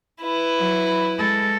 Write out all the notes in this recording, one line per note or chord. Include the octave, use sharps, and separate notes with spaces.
E4 B4
F#3
G#3 A4